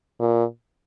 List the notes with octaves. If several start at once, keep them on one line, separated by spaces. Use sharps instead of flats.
A#2